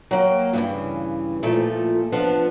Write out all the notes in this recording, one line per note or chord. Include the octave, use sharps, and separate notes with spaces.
F#3 A#3 G5
G2 C#3 E3
A#2 F3 A3
F3 B3 D4